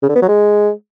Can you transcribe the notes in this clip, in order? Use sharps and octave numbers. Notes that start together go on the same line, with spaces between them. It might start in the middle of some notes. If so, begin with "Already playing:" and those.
C#3
D3
B3
F#3
G#3